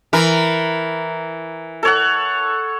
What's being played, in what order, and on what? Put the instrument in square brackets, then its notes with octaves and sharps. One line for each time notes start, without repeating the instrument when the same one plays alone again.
[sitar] E3 A#4
[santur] A4 C#5 F#5